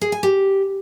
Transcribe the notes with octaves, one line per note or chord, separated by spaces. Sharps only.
G#4
G#5
G4